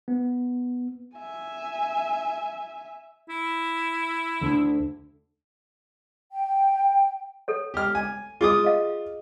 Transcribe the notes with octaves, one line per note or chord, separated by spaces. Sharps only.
B3
E5 G#5
E4
D2 D3
G5
A4 C#5
G4 F6
G#5
F4 G#4 D6 D#6
D#5 F5